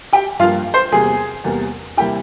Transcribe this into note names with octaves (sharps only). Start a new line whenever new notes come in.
G4 G5
G2 F3 A#3 F4 F5
C5 C6
E2 C3 G3 A#3 G#4 G#5
E2 C3 G3 A#3
C3 G3 A#3 E4 G4 G5